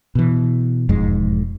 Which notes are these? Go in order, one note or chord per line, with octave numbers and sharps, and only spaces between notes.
B2 E3
E1 F2 G#2 G#3